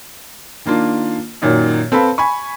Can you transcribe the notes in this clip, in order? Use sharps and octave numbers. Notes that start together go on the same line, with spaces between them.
D#3 A#3 D4 F4
F#2 A#2 D#3 F#3
C4 A4 B4 F5 B5
G#5 B5 C#6